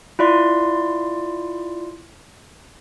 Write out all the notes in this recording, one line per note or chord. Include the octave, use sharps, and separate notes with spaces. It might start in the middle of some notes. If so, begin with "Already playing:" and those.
E4 F4 D5 C6